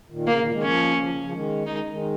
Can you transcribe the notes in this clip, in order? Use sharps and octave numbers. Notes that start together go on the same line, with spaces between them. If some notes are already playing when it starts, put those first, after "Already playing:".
A#2 D#3
C#3 A#3
A#2 D#3
D#3 G#3
F3 A#3 C#4
C#3 F3
C#3
C#3 F3
D#3 G#3
D#3 G#3 D#4
D#3 G#3